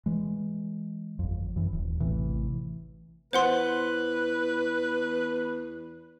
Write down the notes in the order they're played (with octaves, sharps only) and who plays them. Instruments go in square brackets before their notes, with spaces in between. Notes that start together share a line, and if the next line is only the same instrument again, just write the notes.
[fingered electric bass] E3 G#3
G1 F2
F#2 E3
D#1
A1 A2 C3 E3
[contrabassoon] E2 [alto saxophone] B4 [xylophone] C5 F#5 C6